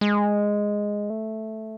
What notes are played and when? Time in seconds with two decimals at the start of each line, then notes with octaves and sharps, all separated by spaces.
0.01 G#3
1.10 A3